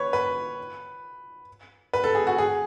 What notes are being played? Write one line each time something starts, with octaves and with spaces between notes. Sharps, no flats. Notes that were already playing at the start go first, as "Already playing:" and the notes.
Already playing: B4 C#5
B4
B4
A4
G#4
F#4
G#4